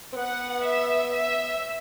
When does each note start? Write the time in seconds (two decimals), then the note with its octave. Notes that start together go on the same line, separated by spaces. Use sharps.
0.13 C4
0.17 B3 F#5
0.65 E5
1.13 E5